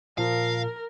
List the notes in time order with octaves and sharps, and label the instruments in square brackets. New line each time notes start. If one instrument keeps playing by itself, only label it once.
[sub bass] A#2 [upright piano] F3 [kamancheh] A#4 [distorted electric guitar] F5